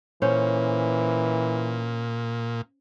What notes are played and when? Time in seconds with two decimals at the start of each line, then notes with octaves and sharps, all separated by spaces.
0.22 A#2 E3 C#4 C5